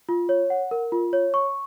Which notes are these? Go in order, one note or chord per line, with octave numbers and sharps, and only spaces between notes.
F4
C#5
F#5
A#4
F4
C#5
C#6